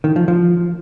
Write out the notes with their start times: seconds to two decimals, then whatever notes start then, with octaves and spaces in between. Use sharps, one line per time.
0.04 D#3
0.16 F3
0.28 F3